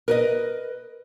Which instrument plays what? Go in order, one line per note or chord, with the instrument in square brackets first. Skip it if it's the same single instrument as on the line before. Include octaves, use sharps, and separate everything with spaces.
[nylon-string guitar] A#4 B4 D#5